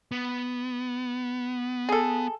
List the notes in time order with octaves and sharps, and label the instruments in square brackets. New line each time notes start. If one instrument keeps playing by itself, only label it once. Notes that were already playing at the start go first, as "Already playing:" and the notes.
[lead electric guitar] B3
[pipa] G#4 A4